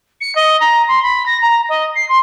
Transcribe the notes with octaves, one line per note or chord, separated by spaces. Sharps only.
C#7
D#5
A#5
C6
B5
A#6
A#5
D#5
C7
C6